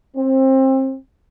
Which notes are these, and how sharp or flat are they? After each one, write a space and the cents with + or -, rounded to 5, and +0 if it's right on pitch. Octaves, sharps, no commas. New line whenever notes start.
C4 +25